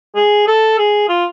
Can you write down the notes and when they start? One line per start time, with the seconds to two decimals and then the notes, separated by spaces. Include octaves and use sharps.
0.16 G#4
0.47 A4
0.78 G#4
1.09 F4